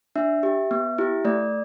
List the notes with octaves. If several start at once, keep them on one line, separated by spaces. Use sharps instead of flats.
D4 E5
G4
B3
E4 G4
A3 D5